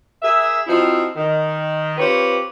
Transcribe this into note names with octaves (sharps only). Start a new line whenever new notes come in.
G#4 A#4 E5
F3 C4 D#4 E4 F#4
D#3
C4 F4 G4 B4 C#5